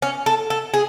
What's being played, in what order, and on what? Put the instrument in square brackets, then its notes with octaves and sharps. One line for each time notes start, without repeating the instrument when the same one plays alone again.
[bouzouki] C#4
A4
A4
G#4